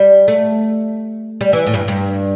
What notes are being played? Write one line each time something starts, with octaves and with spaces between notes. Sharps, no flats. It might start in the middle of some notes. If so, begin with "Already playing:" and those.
Already playing: G3
A3
G3
E3
A2
G2
G2